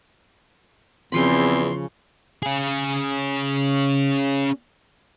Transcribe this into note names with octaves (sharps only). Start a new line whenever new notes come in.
E2 C#3 F3 C4 B5 C6
C#4 G#4